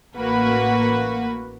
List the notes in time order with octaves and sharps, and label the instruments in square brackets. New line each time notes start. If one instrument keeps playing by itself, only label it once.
[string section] A1 A#3 F#4 B4